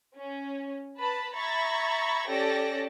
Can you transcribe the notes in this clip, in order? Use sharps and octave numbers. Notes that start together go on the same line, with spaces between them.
C#4
B4 A5 B5
E5 A#5 B5 C#6 G#6 A6
C#4 G4 A4 D5 A5 A#6